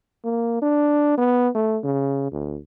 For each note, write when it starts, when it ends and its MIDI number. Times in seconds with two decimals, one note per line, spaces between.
0.25 0.60 58
0.62 1.14 62
1.17 1.49 59
1.55 1.78 57
1.84 2.31 49
2.32 2.58 38